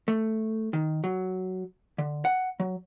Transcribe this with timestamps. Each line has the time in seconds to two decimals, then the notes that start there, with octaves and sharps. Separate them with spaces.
0.08 A3
0.73 D#3
1.04 F#3
1.98 D3
2.25 F#5
2.60 F#3